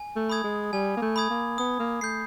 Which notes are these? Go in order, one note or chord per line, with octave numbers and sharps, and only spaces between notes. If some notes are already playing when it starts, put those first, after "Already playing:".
Already playing: G#5
A3
B5 D#6 G#6
G#3
G3 G#5
A#3
A3
B5 D#6 G#6
A#3
B3 D#6
A#3
A3 G6 C7